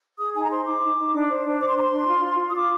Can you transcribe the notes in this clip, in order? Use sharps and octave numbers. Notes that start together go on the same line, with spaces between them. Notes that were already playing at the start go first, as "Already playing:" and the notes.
G#4 D#6
D#4 G#5
A#5
C5 C6
D#4 D6
D#4
D#4
D4
C5
D4
C5 D6
C6
C5 A#5
C6
D4
F4
F4
F4
D#6
F4 D6